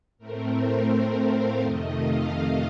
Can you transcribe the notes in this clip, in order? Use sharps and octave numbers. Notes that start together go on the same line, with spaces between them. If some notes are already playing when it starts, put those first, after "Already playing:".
A2 A3 C4 A#4
C5
C5
F5
F2 C3 D#3 A3 D#5
F5
F5